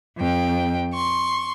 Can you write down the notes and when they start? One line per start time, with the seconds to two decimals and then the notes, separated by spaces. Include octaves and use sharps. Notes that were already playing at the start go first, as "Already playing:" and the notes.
0.17 F2 G5
0.94 C6 C#6